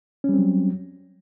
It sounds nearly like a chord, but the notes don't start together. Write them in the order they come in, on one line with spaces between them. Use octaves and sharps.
C#4 G3 C4 F#3